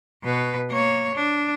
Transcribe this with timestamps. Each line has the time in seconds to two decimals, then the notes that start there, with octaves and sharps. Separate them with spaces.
0.24 B2 B4
0.71 A#3 C#5
1.15 D4